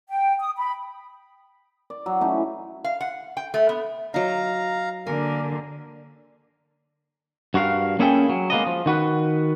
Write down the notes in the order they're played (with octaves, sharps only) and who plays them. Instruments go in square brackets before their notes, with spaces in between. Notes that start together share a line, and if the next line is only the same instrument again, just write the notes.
[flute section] G5
D#6
B5
[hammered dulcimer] D5
F#3
E3 A3 C#4 D#4
[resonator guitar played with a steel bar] F5
F#5
G5
A3
B3
[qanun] F#3 D#4 [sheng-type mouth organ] F5 A#5
[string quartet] D3 A#3 [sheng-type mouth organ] A#4 [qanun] G#5
[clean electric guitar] G2 F#4 A#4 F5
A#3 C#4 E4 G#4 A4 G5
F#3
G#3 A#3 B3 D#5
F3
D#3 F#4 B4